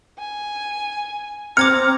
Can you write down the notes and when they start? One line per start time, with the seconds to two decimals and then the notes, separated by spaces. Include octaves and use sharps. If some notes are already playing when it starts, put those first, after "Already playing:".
0.19 G#5
1.57 C4 A#5 D6 F6 G#6 C#7